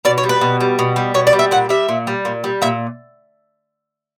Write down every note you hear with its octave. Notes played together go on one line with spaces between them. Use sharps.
B2 D5
C#5
G3
B4
B2
G3
B2
G3
B2 C#5
D5
G3
E5
A#2 F#5
G3 E5
A#2
G3
A#2
G3
A#2 E5